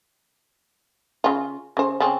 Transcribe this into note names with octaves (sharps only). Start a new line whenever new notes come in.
C#3 F4
C#3 C5
C#3 C4